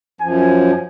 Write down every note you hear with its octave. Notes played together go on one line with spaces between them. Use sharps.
F#2 F3 G#5